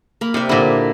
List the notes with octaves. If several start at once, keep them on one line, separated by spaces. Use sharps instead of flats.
A#3 B5
C3 D5 E5
A#2 D3 E4